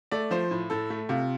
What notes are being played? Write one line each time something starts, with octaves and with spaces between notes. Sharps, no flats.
A3 D5
F3 C5
A2
A2 A4
A3
C3 F4